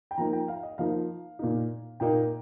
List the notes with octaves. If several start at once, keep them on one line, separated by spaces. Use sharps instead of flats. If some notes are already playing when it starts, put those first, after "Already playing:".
G5
F3 A#3 D#4 A#5
G5
F5
D#5
F3 A#3 D#4 F5
A#2 A#3 D#4
A#2 A#3 D#4 G5